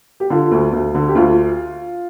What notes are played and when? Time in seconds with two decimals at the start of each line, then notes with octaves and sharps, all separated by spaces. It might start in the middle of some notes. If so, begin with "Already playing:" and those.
0.20 G4
0.30 D3 F4
0.51 D2
0.73 D2
0.95 D3
1.08 G4
1.15 D2 F4